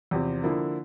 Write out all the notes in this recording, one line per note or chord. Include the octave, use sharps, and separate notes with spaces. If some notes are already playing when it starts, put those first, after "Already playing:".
E2 C3 F3 C4
D3 F3 A#3 E4